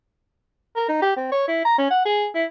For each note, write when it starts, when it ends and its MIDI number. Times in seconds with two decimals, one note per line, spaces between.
0.76 0.88 70
0.89 0.98 63
1.02 1.13 67
1.17 1.30 60
1.32 1.44 73
1.48 1.62 64
1.65 1.77 82
1.78 1.89 61
1.91 2.04 78
2.05 2.27 68
2.35 2.45 64